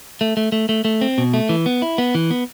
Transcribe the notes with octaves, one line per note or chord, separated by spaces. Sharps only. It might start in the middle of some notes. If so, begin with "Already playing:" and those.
A3
A3
A3
A3
A3
C4
B2
A3
E3
B3
E4
B3
E3
B3